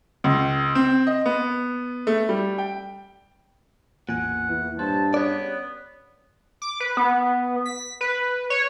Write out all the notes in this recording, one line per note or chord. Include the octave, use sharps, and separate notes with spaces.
C#2
C4
D#5
B3
A3
G3
G5
A1 E2 A#2 F#5 G#5
E2 E3
G2 C5 C#5 A5
B3 C#4 G4 G#4 C#5 D5
D6
B4
B3
B6
B4
C#5